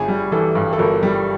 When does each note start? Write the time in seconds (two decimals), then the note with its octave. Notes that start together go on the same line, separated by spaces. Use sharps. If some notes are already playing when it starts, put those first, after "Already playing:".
Already playing: G1 G#4
0.08 G3
0.32 E3 A4
0.55 G2
0.73 A4
0.79 G1 A#4
1.03 G3